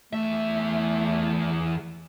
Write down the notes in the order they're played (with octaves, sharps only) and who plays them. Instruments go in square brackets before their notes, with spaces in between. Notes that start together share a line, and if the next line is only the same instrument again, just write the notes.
[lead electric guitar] E2 E5 [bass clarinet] A3